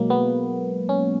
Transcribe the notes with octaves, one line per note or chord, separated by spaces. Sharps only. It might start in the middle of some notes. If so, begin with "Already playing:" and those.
Already playing: B2 F#3 G#3 A#3
B3
C#4